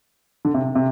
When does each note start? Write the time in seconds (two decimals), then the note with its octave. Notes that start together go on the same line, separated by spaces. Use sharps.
0.45 D3
0.54 C3
0.75 C3